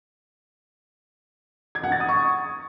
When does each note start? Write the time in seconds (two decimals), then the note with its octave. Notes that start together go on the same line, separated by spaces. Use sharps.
1.75 G#6
1.83 F#5
1.92 A6
2.00 D#6
2.09 C#6